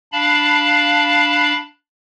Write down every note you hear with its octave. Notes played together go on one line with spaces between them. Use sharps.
D4 F5 A5 B5